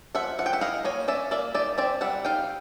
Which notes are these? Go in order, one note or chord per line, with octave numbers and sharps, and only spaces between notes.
F3 E5 F#5
F3 F#5
G5
E5 F#5
E4 D#5 F5
A#3 C#5 D#5
C#4 D5 E5
A#3 D5 E5
D#4 D5 E5
C4 D5 E5
G3 E5 F#5
D#4 F5 G5